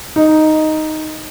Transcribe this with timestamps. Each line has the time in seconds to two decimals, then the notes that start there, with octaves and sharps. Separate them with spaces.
0.16 D#4